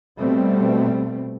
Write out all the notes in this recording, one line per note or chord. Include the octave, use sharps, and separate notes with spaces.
B2 G3 A3 C4